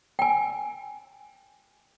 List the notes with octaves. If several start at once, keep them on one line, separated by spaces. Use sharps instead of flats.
G5 G#5